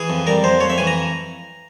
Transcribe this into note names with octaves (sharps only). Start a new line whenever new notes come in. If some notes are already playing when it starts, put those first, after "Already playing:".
Already playing: E3 G#4
F2
G3 A#4
F2 C5
F2 C#5
E5
E3 G#5
A#5